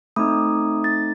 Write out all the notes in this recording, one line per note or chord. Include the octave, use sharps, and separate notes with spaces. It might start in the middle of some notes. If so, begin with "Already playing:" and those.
A3 C4 D#4 D#6
A6